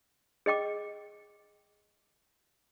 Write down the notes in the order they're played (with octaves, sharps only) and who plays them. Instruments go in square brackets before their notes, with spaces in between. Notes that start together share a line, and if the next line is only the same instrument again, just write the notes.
[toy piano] G#4 D#5 G5 D6